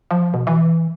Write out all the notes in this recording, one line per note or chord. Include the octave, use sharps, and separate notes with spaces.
F3
B2
E3